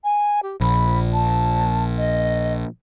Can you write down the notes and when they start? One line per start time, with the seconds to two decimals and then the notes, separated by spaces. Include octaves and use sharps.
0.04 G#5
0.43 G4
0.61 A#1 B5
1.13 A5
1.98 D#5